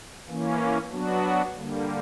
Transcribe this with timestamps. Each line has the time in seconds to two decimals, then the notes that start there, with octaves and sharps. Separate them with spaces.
0.27 E3 A#3 C#4
0.90 F#3 B3 D4 F#4
1.55 D3 G3 A#3